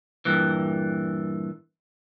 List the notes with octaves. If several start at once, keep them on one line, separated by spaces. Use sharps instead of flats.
G2 A#2 E3